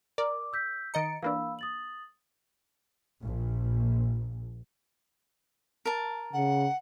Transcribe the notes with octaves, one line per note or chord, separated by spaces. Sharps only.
A#4 D5 D6
E6 G6 B6
D#3 D#5 A#5 A6 C#7 D7
E3 A#3 D4 F5 B5 E6
D#6 A6 F#7
A#1
A#4 A5
C#3 F#5